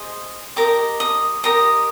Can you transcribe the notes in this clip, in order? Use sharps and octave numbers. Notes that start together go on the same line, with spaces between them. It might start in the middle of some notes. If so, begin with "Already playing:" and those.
Already playing: G#4 C5 D#5
G4 A#4 D#5 D6
D#6
G4 A#4 D#5 D#6